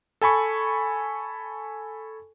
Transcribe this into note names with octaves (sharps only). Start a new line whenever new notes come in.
A4 G#5 B5 C#6